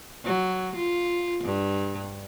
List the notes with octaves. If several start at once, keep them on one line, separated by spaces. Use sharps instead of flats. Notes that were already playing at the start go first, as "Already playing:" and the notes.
F#3
F4
G2